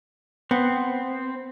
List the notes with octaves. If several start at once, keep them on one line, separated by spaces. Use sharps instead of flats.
B3 C4